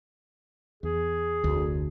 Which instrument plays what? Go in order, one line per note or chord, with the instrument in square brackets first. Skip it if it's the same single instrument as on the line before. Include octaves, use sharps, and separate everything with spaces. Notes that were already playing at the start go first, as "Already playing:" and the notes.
[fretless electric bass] E2 [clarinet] G#4
[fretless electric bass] F1 D2